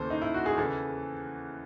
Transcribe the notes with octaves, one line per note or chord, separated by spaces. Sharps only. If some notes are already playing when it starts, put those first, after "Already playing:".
Already playing: D#2 C#3 E3 A4 C5
D#4
E4
F#4
G#4
E2 C#3 E3 A4